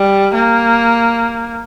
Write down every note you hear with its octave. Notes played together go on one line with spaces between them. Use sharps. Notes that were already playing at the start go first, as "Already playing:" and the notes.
Already playing: G3
A#3